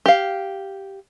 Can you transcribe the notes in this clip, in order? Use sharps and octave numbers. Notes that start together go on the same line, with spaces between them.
G4 F5